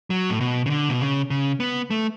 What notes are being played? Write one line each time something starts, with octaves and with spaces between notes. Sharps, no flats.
F#3
A2
B2
C#3
D3
B2
C#3
C#3
B3
A3